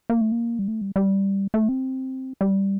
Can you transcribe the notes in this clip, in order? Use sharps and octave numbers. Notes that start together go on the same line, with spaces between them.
A#3
A3
A#3
G3
A3
G3
G3
A3
C4
G3